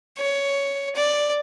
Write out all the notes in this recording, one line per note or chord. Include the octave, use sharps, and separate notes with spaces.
C#5
D5